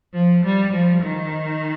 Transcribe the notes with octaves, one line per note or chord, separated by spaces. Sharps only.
F3
G3
F3
D#3